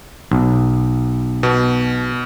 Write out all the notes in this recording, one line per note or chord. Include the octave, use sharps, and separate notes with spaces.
B1
B2